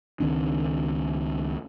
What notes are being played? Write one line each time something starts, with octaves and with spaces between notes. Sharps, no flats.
C#2 D#3 C4 D4